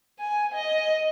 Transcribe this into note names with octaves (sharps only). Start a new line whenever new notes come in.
G#5
D#5